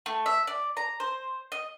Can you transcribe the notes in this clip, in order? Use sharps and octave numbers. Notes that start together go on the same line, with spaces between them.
A3
E5
D5
A#5
C5
D#5